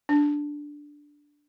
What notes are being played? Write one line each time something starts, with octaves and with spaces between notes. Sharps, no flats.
D4